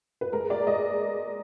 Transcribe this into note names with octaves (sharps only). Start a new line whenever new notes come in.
B4
G#3 A#4
G#3 D5
G#3 D#5